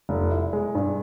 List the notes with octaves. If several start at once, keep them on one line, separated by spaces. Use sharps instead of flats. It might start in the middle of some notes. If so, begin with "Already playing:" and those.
F1
E4
G#3
G2